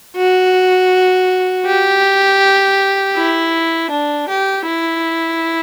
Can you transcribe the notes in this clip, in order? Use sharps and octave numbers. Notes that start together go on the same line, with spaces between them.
F#4
G4
E4
D4
G4
E4